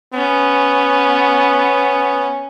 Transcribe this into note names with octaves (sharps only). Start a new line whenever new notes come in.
B3 C#4